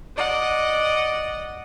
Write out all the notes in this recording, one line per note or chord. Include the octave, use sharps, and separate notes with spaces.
D5 D#5 F#5